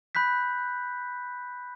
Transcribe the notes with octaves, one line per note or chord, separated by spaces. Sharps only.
B5 F#6 G6 B6